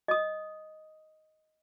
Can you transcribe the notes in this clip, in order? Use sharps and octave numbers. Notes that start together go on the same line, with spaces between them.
D#5 D#6